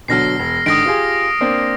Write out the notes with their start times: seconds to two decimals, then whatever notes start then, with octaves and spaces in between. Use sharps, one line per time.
0.08 B2 D3 F#3 F6 A#6 C7
0.39 E1
0.66 G#2 D3 D#3 D#6 A#6 D7
0.86 F4 G4 G#4
1.41 A#3 C4 D4